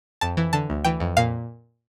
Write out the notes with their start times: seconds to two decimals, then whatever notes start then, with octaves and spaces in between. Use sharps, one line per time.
0.21 F2 A5
0.37 E3
0.53 D3 A5
0.70 D2
0.84 E3 G5
1.00 F2
1.17 A#2 F5